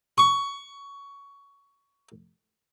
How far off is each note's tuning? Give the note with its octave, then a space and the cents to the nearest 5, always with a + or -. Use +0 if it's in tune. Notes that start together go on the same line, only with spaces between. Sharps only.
C#6 +15